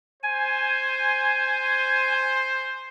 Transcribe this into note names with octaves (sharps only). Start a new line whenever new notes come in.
C5 G#5